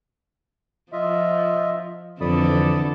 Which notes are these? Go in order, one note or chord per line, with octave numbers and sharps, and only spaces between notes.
F3 F4 D#5 E5
F2 D3 E3 A4 D5 B5 D#6